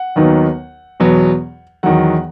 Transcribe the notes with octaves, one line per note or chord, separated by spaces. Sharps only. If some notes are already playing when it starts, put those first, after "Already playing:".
Already playing: F#5
D#2 D#3 F#3 B3 D#4
E2 B2 F#3 B3
E2 D#3 F#3 F#5